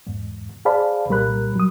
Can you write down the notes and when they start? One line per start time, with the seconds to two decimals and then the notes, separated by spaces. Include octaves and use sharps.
0.07 E2 G#2
0.65 G#4 C5 D5 F5 A5 B5
1.09 C2 A#2 G3 A#4 B5 F#6
1.55 F#3 D#6